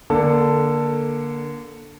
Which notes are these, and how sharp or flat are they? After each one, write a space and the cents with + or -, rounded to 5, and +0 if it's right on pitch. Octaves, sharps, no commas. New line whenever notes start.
D3 +0 A#3 +20 A4 +10